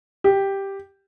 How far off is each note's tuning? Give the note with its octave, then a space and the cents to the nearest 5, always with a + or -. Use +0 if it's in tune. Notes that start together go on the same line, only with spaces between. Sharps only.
G4 +0